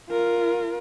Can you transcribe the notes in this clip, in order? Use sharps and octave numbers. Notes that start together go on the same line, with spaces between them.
F4 A#4